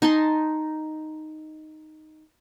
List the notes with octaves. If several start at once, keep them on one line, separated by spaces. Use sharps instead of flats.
D#4 G#5 A5 C6